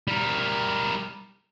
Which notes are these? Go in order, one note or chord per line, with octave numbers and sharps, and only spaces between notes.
G3 A#4